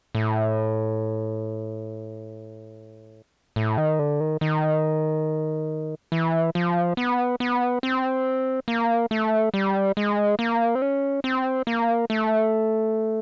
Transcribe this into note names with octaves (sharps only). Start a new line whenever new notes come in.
A2
A2
D#3
D3
D#3
D#3
E3
F3
B3
B3
C4
A#3
A3
G3
G#3
A#3
C4
C#4
C4
A#3
A3